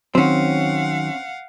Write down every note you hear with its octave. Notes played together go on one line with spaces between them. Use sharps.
D#3 F#3 C4 C#4 F5 F#5